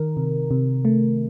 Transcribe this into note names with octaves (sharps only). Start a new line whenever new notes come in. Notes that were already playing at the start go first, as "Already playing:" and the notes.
Already playing: D#3 A#4
C3
C3
A3